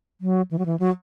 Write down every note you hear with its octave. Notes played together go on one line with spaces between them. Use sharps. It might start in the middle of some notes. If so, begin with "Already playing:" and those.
F#3
E3
F#3
E3
F#3